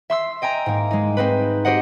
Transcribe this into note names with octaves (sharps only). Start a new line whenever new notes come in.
E5 C6 E6 C7
D#5 G5 G#5 A#5
G#2 A#3
G#3 D#4
C4 D#4 B4
F#4 G4 C5 D#5 F#5